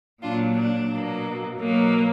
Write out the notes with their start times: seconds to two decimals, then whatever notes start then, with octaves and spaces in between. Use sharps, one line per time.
0.23 A#2 F#3 A#3 D4 F4
0.57 D4
0.92 B2 F#3 A#3
1.59 B2 F#3 A#3